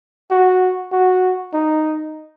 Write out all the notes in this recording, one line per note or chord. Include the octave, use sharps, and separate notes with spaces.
F#4
F#4
D#4